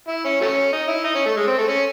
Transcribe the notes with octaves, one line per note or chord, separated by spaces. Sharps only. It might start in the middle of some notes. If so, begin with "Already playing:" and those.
E4
C#4
F#3 A3 C#4
D#4
E4
D#4
C#4
A3
G#3
C4
A3
C#4